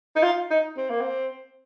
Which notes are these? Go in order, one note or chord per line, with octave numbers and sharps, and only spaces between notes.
D#4
F4
D#4
C4
A#3
C4